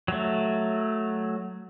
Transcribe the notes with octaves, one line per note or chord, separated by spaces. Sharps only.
F#3 A3